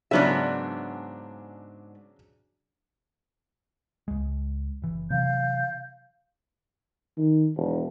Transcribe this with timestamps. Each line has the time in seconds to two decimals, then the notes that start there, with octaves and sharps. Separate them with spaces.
0.11 G#2 C#3 F#3 B3 D4 E5
4.08 C#2 G#3
4.82 F#1 E3
5.10 C3 E3 F#3 F5 G6
7.18 D#3
7.56 E1